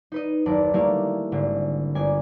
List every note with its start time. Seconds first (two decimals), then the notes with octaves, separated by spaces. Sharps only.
0.12 D#4 B4 D#5
0.46 F#1 D#2 D5 A5
0.74 G3 A3 A#3 E4 D5 F5
1.32 G#1 D3
1.95 G1 D5 G#5